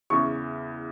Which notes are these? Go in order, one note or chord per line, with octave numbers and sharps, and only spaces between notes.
E2 C#3 E3 C#6